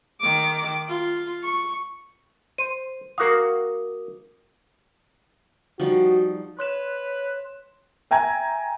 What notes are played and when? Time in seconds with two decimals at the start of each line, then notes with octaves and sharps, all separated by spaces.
0.21 D#3 D6
0.88 F4
1.43 C#6
2.58 C5 D#7
3.18 A#3 F#4 A#4 F5 D6 D#6
5.80 F3 G3 D#4 F#4
6.59 B4 C#5 C6 F#6 E7
8.11 E5 G5 G#5 A#5 G#6